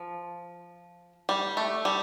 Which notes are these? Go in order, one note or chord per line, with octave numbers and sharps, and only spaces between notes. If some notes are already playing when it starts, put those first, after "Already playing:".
Already playing: F3
G3
A3
G3